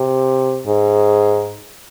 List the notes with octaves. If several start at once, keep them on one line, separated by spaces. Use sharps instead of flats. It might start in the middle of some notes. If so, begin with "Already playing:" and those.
Already playing: C3
G#2